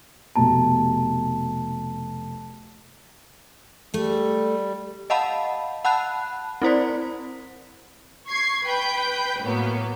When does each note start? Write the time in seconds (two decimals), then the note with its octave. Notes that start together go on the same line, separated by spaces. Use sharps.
0.35 F1 B2 A5 A#5
3.94 G3 A3 A4
5.10 D#5 F5 F#5 A5 B5
5.85 F#5 A5 B5 F#6
6.62 C4 E4 C5 D5
8.28 C#6 G#6 C7
8.64 B4 G5 B5 G6
9.43 A2 F#3 A#3 B3